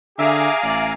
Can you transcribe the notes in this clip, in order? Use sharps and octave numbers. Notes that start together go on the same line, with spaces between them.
D3 G4 G#4 E5 F5 G#5 A#5 D6
A1 D5